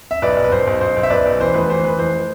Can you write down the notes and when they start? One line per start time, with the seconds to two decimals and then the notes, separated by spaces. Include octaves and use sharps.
0.11 E5
0.22 B1 B4 D5
0.37 B1
0.44 B4
0.52 B1 C5
0.67 B1
0.81 B1 C5
0.96 B1
1.03 E5
1.10 B1 B4 D5
1.25 B1
1.40 E3 C5
1.54 F1 B4
1.69 E3 C5
1.84 E3 B4
1.99 F1 C5